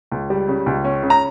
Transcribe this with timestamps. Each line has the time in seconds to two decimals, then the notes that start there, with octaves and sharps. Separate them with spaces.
0.11 C#2
0.30 G3
0.48 C#3
0.66 C#2
0.85 C#4
1.03 C#3
1.10 A#5